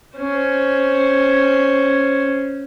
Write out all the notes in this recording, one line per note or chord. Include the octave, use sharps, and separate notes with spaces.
C#4 C5